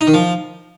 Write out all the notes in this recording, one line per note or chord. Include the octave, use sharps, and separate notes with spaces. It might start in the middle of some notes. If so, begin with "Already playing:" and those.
D#4
D#3
F3